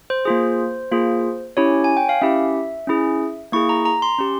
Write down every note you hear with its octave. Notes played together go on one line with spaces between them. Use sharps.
C5
A#3 F4 G#4
A#3 F4 G#4
C#4 E4 G4 C#5
G#5
G5
F5
C#4 E4 G4 E5
C#4 E4 G#4
A#3 E4 G#4 C#6
A#5
A#5
C6
C#4 G4